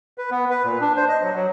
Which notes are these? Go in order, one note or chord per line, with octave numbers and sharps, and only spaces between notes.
B4
B3
B4
A#2
D4
C5
D#5
F#3
F#3